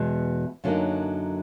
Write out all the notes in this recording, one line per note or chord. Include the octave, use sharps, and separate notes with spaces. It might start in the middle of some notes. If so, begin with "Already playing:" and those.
Already playing: E2 B2 G#3
F#2 D3 F#3 A#3 D#4